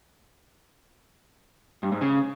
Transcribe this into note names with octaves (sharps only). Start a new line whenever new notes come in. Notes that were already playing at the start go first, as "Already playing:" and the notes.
G2
G#2
C#3